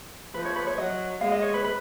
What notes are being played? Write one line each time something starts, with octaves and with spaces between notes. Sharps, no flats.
F3 B4
C#5
B4
C#5
F#3 D#5
G#3 F5
D#5
C#5
B4
B4